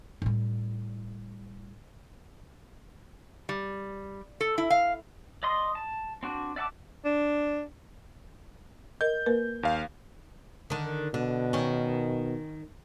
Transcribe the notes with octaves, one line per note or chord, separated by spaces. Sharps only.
A2 G3
G3
A4
E4
F5
D5 D#5 C6 D#6
A5
C4 D4 F#4
D5 E5 F#5 A5 D6
D4
A#4 D#5 G6
A#3 A#4 B4
D#2 F5
D3 D#3
B2 D3
D#3 C#4